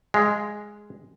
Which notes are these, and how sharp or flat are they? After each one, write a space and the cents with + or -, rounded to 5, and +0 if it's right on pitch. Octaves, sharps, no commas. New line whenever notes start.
G#3 +0 F5 -25